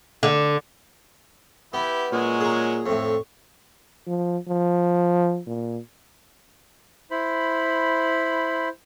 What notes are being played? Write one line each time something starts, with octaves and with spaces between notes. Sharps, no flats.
D3
B3 E4 G4
A#2 F#3 G#3 C#4
G#4 A#5
F2 A2 C#5
F3
F3
A#2
E4 C5 B5